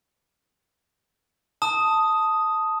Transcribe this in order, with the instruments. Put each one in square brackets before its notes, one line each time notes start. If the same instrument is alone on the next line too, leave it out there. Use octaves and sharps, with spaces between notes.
[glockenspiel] A5 D#6